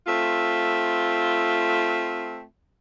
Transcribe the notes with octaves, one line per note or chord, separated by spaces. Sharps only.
A3 C4 F4